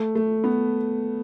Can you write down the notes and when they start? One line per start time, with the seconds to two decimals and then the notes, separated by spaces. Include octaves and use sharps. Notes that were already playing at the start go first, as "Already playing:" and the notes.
Already playing: A3
0.15 A3
0.44 B3